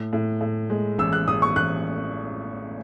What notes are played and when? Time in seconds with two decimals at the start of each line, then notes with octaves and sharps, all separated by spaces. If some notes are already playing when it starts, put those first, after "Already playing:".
Already playing: A2
0.13 A2
0.41 A2
0.70 G#3
0.98 A1 E6
1.13 F#6
1.28 A1 D#6
1.42 C#6
1.56 A1 F#6